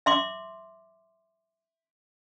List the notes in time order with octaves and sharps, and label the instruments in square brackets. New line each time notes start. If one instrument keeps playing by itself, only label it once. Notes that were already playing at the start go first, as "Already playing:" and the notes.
[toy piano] E5 C6 D6